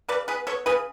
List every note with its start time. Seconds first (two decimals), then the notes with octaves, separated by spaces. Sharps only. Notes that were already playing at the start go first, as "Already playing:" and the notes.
0.08 C#3 B4 D5
0.28 B3 G#4 B4
0.47 B3 A4 C#5
0.66 C#3 G#4 B4